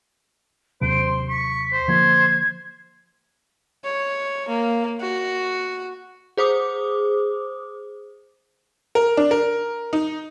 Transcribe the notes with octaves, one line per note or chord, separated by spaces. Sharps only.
D#2 C3 F#3 C5 D7
C6
C#6 B6
C5
D3 F3 A#3 G#6
C#5
A#3
F#4
G#4 C5 D6 D#6
A#4
D4
A#4
D#4